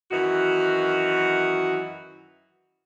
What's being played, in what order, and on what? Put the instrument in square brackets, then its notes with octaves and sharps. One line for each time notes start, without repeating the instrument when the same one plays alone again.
[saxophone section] F#2 D#3 E3 F#4